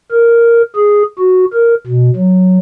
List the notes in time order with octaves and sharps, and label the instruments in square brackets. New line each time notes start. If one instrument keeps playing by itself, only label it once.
[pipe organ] A#4
G#4
F#4
A#4
B2
F#3